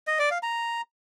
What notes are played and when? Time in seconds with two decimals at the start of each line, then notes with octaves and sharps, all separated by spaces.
0.07 D#5
0.19 D5
0.31 F5
0.43 A#5